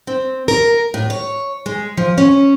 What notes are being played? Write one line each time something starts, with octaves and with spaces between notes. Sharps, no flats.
C4
A#4
A2
C#5
G#3
F3
C#4